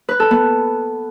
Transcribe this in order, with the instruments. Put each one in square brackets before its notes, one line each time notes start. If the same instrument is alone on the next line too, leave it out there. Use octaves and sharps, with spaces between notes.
[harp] B4
A4
B3